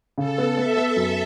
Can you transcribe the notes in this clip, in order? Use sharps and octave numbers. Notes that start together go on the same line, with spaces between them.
C#3 A4
B3
B3 E5
B3
F#2